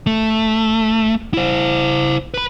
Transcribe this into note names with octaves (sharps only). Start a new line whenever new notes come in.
A3
E4 C5
B4 B5